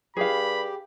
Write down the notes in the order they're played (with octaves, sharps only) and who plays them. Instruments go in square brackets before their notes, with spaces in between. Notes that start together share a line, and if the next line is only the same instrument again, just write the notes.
[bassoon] G2 [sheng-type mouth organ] G4 [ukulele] G#4 F5 [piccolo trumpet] B5